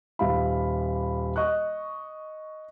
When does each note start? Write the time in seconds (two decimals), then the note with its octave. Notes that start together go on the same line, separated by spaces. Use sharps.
0.19 D#1 E5 F5 B5
1.36 D#5 C#6 F#6